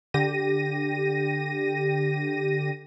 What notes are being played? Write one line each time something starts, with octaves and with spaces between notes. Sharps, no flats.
D3 G4 A#6 D#7